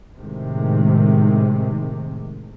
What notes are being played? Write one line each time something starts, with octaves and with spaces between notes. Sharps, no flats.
A2 C3 D#3 G#3